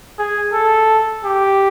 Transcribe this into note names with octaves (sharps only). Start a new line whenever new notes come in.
G#4
A4
G4